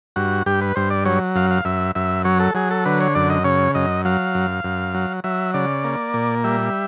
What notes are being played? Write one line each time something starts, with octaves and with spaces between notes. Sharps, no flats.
G2 F#4
G2 G4
B4
G2 C5
D5
F#3 C#5
F#2 F5
F5
F#2 E5
F#2 E5
F#3 C#5
A4
F#3 G#4
A4
D3 B4
C#5
F#2 D5
D#5
C#3 C#5
F#2 D#5
F#3 F5
F#2
F#2
F#3
F#3 E5
C#3 D5
A#3
A#2
G3 E5